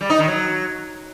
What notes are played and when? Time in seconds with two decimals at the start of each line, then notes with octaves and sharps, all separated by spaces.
0.01 G3
0.10 D#4
0.19 D#3
0.28 F#3